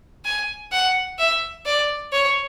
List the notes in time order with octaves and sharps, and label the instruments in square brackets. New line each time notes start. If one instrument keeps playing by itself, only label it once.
[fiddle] G#5
F#5
E5
D5
C#5